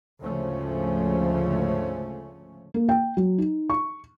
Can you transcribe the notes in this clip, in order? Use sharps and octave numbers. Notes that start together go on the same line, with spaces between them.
D2 G#2 C#3 F3 A3 C#4
A#3
G5
F#3
D#4
C#6